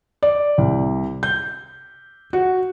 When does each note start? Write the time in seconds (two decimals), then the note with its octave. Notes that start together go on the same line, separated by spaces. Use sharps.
0.23 D5
0.58 C2
1.23 G6
2.33 F#4